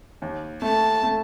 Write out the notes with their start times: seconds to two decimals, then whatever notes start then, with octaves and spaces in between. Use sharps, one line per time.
0.22 D#2
0.62 A3 A5
1.03 A3